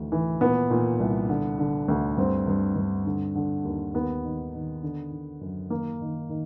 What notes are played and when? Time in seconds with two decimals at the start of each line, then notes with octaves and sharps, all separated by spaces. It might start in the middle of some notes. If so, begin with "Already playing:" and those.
Already playing: D2 D#3 E3
0.12 E3
0.41 A#2 B3
0.70 A#2
1.00 C2
1.29 D3
1.58 D3
1.89 D2
2.17 G2 C4
2.47 G2
2.76 G2
3.06 D3
3.35 D3
3.64 D#2
3.94 D#2 B3
4.24 D#3
4.54 D#3
4.83 D3
5.12 D3
5.41 F#2
5.70 D#3 A#3
6.01 D#3
6.29 D#3